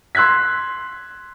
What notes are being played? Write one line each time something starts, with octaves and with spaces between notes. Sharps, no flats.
C6 E6 F#6 G#6 B6